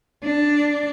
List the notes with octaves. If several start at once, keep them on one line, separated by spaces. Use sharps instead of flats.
D4